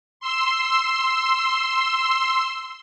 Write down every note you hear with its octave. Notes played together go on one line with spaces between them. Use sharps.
C6 E6